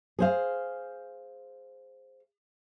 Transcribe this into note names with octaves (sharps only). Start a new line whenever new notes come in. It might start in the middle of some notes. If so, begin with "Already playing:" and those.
G#4 C5 F5